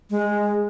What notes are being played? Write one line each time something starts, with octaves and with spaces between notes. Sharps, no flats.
G#3